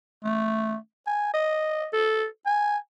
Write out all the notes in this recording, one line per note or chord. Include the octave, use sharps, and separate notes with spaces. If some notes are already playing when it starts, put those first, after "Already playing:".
A3
G#5
D#5
A4
G#5